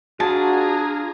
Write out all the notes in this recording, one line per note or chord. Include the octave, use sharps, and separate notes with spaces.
D4 F4 F#4 G#4 A5 A#5